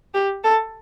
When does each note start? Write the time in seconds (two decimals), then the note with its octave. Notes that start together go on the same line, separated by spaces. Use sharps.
0.14 G4
0.44 A4